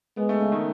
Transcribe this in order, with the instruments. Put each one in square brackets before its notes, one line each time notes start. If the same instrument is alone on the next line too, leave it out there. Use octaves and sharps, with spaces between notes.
[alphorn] G#3 [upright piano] B3
[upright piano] A3
C#3
D#3